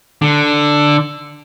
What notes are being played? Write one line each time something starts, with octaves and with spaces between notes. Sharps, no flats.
D3